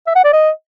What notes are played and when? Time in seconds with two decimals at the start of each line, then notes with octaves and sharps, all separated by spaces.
0.07 E5
0.15 F#5
0.24 D5
0.33 D#5